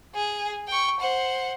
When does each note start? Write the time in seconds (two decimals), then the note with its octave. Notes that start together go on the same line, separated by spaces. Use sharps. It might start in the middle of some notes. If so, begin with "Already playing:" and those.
0.15 G#4
0.68 G5 C#6
1.00 C5 F#5